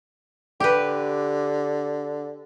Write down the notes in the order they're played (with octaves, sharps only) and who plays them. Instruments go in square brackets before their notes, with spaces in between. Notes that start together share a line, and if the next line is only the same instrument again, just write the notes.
[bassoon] D3 [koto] G4 B4